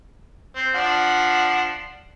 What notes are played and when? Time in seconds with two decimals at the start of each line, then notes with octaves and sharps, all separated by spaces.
0.55 C4
0.75 F3 D4 F#5